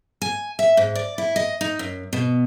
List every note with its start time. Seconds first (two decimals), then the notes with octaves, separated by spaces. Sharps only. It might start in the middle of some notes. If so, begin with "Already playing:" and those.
0.22 G#5
0.59 E5
0.77 G#2
0.95 D5
1.18 E4
1.36 D#5
1.61 D#4
1.79 F#2
2.13 B2